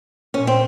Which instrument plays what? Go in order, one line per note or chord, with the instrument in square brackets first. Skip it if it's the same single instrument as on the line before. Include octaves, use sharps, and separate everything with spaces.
[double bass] A#2 [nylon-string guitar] C#4
[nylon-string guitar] C4